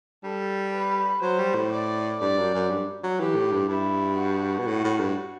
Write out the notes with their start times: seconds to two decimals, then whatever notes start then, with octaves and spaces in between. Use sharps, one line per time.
0.24 G3 A4
0.73 B4
1.22 F#3 C5
1.39 G3
1.54 A2
1.71 D5
2.20 G2 D5
2.38 F#2
2.54 F#2
2.70 G2
3.03 F#3
3.20 E3 G4
3.36 A2
3.53 G2
3.69 G2 E4
4.18 F#4
4.59 B2
4.67 A2
4.84 A2
5.00 G2